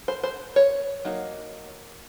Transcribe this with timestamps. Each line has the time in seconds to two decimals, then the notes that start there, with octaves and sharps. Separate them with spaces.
0.08 C5
0.23 C5
0.56 C#5
1.05 F#3 A#3 D#4